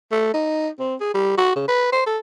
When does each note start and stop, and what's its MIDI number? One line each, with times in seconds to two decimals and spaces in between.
0.12 0.33 57
0.34 0.69 63
0.79 0.95 60
1.00 1.13 68
1.14 1.35 55
1.38 1.52 66
1.56 1.63 49
1.68 1.88 71
1.93 2.02 72
2.07 2.18 69